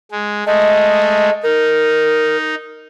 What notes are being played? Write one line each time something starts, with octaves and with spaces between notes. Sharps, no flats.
G#3
G#3 A3 D#5
D#4 A#4